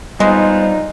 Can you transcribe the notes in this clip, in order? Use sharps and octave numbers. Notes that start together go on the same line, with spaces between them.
G3 G#3 B3 D#4 F4 C5